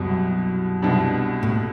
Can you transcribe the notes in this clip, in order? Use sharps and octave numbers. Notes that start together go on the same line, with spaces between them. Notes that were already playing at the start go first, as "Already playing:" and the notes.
Already playing: C2 F#2 B2 G3
C2 B2 G3 D4
A2